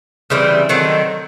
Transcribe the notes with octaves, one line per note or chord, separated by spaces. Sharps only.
C#3 E3 G3 C4
D#3 F#3 A3 C4